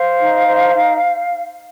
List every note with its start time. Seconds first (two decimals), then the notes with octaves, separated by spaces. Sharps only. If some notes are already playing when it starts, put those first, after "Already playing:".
Already playing: C5 F5
0.19 D#4
0.47 C5
0.74 D#4